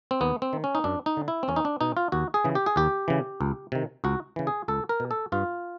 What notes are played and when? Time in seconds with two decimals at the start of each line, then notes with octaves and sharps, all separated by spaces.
0.11 C4
0.21 D#2 B3
0.42 C4
0.53 D#3
0.64 C#4
0.75 D#4
0.84 F#2 D4
1.06 D#4
1.17 D3
1.28 E4
1.43 C4
1.48 E2 C#4
1.56 D#4
1.65 D4
1.81 B2 D#4
1.97 F4
2.12 D#2 F#4
2.34 G#4
2.44 C#3 E3
2.55 G4
2.66 G#4
2.76 D#2 G4
3.08 C#3 E3
3.41 C#2
3.72 C3 D#3
4.04 C#2 F#4
4.36 C#3 E3
4.47 G#4
4.68 C#2 A4
4.89 A#4
5.00 B2
5.11 A4
5.32 G2 F4